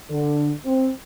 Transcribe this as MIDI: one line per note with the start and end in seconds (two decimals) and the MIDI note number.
0.10 0.51 50
0.65 0.90 60